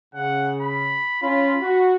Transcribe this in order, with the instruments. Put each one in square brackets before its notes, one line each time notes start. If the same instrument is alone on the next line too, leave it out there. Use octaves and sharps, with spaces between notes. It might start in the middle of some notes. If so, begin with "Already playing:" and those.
[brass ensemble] C#3 [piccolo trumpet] F#5
[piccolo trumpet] B5
[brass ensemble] C#4 F4 [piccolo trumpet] B5
[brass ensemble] F#4